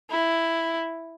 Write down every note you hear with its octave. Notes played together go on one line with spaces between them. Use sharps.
E4